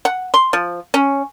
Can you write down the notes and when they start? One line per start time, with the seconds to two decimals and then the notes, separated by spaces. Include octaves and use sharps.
0.05 F#5
0.34 C6
0.53 F3
0.94 C#4